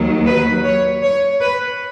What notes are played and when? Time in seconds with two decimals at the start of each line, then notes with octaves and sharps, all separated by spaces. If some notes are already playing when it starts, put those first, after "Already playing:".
Already playing: D#2 D#3 F#3
0.27 B4
0.65 C#5
1.03 C#5
1.41 B4